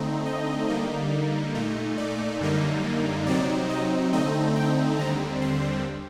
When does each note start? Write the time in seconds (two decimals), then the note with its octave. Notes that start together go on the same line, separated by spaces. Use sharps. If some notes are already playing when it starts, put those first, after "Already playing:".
Already playing: D3 A3 C4 D#4
0.26 D#5
0.68 D3 G3 A#3 D#4
1.54 A#2 A3 D#4
1.98 D5
2.40 F#2 D3 G3 A#3 D#4
3.26 C3 F#3 C4 D#4 D5
3.70 D#5
4.13 D3 A3 C4 D#4 D#5
4.56 G5
4.99 D#2 D3 G3 C4 A#5
5.42 C6